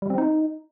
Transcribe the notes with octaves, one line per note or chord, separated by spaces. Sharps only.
G3
C4
D#4